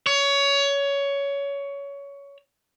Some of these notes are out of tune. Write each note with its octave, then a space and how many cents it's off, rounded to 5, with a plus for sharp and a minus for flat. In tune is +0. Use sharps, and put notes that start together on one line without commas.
C#5 +20